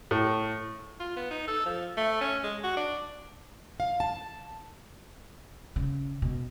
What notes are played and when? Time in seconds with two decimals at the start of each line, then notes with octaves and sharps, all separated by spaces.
0.11 A2
1.00 F4
1.16 B3
1.30 D#4
1.47 A4
1.66 F3
1.97 A3
2.21 C#4
2.43 G#3
2.63 F#4
2.77 D4
3.80 F5
4.00 A5
5.76 C#3
6.22 B2